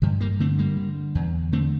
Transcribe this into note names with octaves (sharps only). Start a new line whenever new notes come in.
G2 D3 F3
G3 A#3
D3 A3 C4
G3 A#3
D3
E2
D3 A3 C4